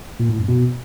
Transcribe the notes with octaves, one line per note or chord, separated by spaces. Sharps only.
A#2
A2
F#2
B2